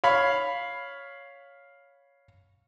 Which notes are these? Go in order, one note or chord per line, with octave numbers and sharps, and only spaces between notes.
C#5 F5 B5